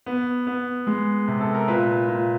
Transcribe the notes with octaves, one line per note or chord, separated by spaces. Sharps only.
B3
B3
G#3
C3
A4
A#4
A#2 B4
A#2